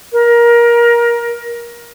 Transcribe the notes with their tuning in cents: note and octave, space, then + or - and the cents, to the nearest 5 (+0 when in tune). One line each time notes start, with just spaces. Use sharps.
A#4 +20